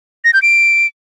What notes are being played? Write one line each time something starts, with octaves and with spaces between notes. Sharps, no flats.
A#6
G6
D7